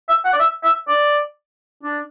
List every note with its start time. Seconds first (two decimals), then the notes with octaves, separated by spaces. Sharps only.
0.09 E5
0.25 F#5
0.33 D5
0.40 E5
0.64 E5
0.88 D5
1.83 D4